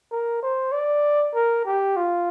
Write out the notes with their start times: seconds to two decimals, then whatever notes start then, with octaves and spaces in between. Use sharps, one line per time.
0.11 A#4
0.43 C5
0.72 D5
1.34 A#4
1.66 G4
1.97 F4